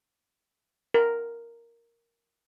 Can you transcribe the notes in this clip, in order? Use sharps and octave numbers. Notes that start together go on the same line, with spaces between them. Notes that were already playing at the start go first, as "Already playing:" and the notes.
A#4